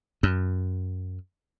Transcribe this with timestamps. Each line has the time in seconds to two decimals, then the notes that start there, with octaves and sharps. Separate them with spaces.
0.23 F#2